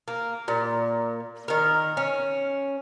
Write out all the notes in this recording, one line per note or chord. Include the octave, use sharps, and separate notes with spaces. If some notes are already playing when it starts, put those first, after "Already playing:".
A#3
A#2
D#3 A#4
C#4